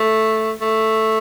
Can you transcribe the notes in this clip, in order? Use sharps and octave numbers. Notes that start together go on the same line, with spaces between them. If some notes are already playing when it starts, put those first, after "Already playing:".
Already playing: A3
A3